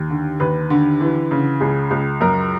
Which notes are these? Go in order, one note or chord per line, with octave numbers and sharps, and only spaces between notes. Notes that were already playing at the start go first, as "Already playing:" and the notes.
Already playing: D#2
D3
D#2 B4
D3
E3
C#3
C#2 G#4
C#2
F#2 A#4